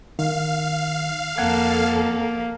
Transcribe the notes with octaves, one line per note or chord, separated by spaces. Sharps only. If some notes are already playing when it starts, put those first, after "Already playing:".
D#3 F5
F2 A#3 A4 F#5 G#6